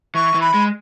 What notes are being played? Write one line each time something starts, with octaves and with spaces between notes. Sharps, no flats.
E3 C#6
E3
B5
G#3